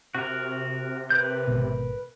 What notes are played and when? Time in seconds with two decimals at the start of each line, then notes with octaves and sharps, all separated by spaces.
0.15 C3 F#4 A#4
1.10 A#4 B4 G6
1.47 G#1 B2